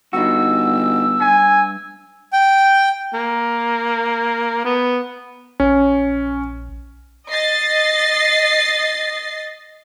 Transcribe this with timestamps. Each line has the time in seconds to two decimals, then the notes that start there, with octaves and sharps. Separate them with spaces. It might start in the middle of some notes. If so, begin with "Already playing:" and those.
0.13 G1 D#4 F#4 E6
1.20 G2 G#5
2.33 G5
3.13 A#3
4.65 B3
5.60 A#1 C#4
7.31 D#5 A6 C7